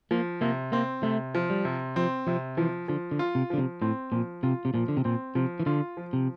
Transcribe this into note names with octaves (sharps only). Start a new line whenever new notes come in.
F3 A#3
C3 A#3
A#3 C4
C3 A3
F3
G3
C3
F3 C4
C3 F3
E3 F3
D3 F3
D3
F4
C3
D3 F3
C3
A2 C4
A#2 F3
C3 F4
C3
A#2 F3
D3
C3
A#2 C4
C3 F3
E3
D3 F4
F3
C3